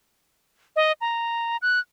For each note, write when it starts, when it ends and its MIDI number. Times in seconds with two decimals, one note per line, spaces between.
0.76 0.92 75
1.01 1.57 82
1.62 1.79 90